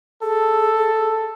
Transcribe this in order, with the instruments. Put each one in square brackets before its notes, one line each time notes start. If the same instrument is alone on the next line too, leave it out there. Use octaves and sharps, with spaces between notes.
[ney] G#4 [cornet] A4